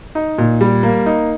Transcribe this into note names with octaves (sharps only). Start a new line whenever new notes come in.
D#4
A#2
G3
A#3
D#4